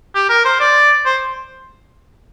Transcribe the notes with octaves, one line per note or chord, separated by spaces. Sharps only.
G4
A#4
C5
D5
C5